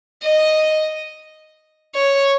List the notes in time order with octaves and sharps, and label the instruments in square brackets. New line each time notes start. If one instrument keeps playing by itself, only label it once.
[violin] D#5
C#5